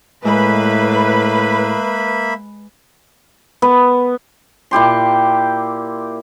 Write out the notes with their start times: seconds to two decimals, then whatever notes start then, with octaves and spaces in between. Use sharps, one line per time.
0.25 A2 G#3 A#3 B4 E5 B5
3.62 B3
4.71 A#2 E4 G4 C6